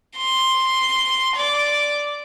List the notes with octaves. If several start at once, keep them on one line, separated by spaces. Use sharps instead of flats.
C6
D5